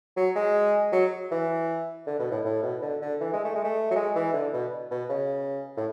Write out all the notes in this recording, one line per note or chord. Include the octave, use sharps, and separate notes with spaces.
F#3
G#3
F#3
E3
D3
B2
A2
A2
B2
D3
D3
E3
G#3
A3
G#3
A3
F#3
G#3
E3
D3
B2
B2
C#3
A2